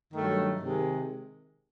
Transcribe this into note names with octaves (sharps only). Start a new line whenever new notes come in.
G2 D#3 F#3 A3
C3 D#3 G#3